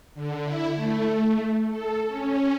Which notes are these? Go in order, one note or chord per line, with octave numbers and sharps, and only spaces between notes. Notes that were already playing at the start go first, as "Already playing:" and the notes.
D3
E4
A3
A4
C#4